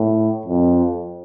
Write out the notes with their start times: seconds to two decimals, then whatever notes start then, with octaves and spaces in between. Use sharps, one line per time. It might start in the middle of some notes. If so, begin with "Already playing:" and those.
Already playing: A2
0.46 F2